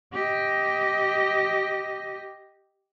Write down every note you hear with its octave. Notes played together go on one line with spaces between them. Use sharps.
G4 D#5